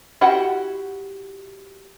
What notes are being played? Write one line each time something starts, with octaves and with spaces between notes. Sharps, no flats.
E4 F#4 G4 F#5